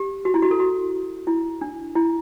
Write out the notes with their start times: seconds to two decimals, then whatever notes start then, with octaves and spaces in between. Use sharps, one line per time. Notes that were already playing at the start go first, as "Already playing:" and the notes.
Already playing: G4
0.25 F#4
0.34 E4
0.42 F#4
0.51 A4
0.60 F#4
1.27 E4
1.61 D4
1.95 E4